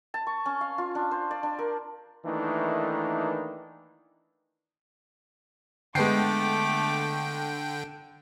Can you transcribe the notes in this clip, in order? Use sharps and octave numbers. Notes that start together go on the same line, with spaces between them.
A5
C#6
C#4
F5
F4
D4
C5
D5
D4
A#4
D#3 E3 A3 A#3 D4 D#4
D3 G#3 A3 B3 G5 D6 C7